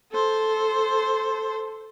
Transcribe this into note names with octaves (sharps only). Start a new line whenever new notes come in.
A4 C5